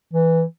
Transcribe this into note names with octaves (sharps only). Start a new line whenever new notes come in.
E3